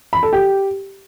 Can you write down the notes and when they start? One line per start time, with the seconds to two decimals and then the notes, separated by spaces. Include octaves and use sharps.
0.13 B5
0.23 A4
0.33 G4